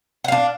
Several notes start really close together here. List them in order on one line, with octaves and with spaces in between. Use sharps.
F#5 F5 D4